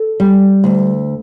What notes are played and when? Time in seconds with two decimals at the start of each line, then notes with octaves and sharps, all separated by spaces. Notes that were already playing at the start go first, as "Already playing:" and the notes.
Already playing: A4
0.20 G3
0.64 D2